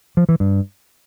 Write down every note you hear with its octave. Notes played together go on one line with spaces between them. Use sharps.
F3
E3
G2